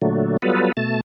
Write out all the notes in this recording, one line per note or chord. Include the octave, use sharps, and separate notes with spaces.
A#2 D3 F#3 A3
F#3 G3 B3 F4 A4 B4
B2 A3 A5